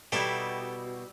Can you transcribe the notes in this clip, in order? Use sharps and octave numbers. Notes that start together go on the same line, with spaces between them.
B2 G3 D#4 E4 G4 A4 E5